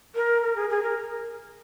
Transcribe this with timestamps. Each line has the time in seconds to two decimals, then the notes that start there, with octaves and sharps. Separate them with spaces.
0.15 A#4
0.42 A#4
0.56 G#4
0.70 G#4
0.83 A#4